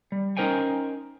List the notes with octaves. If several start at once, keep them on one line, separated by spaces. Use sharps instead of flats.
G3
C#4 D#4 A#4 C5 G5 G#5